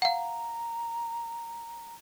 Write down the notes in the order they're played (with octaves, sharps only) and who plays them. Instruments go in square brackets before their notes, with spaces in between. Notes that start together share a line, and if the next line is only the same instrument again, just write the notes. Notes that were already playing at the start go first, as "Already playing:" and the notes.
[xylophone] F5 F#5 [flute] A#5